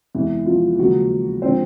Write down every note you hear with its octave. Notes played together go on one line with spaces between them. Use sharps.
E2 C3 E3 G#3 E4
F3 F4
D#2 C#3 F3 F#3 G#3 F#4
D3 F3 G#3 C4 C5